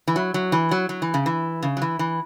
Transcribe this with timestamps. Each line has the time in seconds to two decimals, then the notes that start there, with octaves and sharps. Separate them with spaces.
0.08 E3
0.16 F#3
0.34 F#3
0.52 E3
0.71 F#3
0.89 F#3
1.02 E3
1.14 C#3
1.26 E3
1.63 C#3
1.77 F#3
1.82 E3
1.99 E3